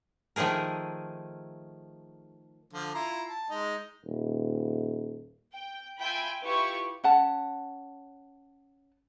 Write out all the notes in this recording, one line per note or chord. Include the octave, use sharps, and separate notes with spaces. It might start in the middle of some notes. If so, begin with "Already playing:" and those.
D#3 F3 A3 G#4 A#4
D3 F3
E4 F4 A#5
A5
G#3 D#4
D#1
G5
F4 E5 G5 G#5 B5
E4 F4 G4 B4 C#6
C#4 F#5 A5